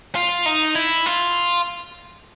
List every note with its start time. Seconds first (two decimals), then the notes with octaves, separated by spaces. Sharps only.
0.15 F4
0.46 D#4
0.76 E4
1.06 F4